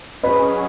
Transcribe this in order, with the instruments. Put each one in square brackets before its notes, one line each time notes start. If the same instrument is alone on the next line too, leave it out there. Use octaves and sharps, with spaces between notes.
[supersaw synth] F#3 C#4 G#4 [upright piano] B4 D#5